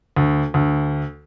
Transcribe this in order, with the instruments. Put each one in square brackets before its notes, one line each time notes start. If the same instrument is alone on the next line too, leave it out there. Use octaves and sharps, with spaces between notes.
[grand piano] D2
D2